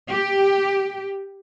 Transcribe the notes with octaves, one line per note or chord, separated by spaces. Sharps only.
G4